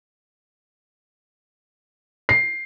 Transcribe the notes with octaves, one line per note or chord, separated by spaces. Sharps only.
C7